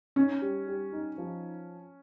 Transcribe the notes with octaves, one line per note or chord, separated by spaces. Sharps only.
C#4 D#4
G3
G3
D#4
F3